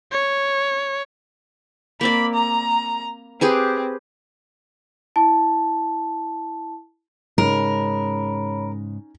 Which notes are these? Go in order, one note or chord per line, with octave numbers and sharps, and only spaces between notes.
C#5
A#3 C4 D5 B5
A#5
C4 G4 G#4 B4
E4 A5
G#2 C#3 G#3 C#4 D#4 A#4 C#5 B5